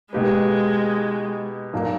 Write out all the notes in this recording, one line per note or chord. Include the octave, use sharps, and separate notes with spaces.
B2 G#3 A#3 D#4 G4 B4
B1 A#2 A#3